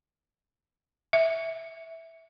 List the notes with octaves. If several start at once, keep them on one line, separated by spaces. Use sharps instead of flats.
E5